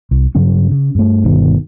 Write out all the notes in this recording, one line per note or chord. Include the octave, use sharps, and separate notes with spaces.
C2
G2 C#3 F#3 C#4
C#3
G2 A3
G1 G2 B2 D#3